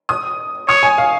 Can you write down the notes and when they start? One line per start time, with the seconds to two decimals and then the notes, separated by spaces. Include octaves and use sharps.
0.09 D#6
0.68 C#5 D#6
0.83 G#5
0.98 F5